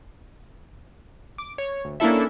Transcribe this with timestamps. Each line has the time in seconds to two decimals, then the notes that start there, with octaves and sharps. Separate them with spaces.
1.38 D6
1.58 C#5
1.85 D2
2.00 A#3 C#4 D4 E4 A4 E5